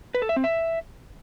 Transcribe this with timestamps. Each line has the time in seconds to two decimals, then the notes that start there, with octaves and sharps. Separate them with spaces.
0.15 B4
0.22 A4
0.29 E5
0.36 C4
0.44 E5